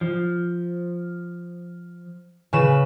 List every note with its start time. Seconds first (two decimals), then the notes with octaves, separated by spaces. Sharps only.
0.01 F3
2.53 C#3 B4 E7